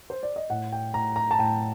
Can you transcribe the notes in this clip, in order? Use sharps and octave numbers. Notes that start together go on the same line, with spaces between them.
C5
D5
D#5
A2 F#5
G5
A2 A#5
A#5
A5
A2 G5